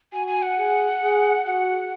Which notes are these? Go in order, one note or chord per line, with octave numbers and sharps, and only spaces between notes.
F#4 G#5
G#5
F#5
G#4
G#4
F#4 F#5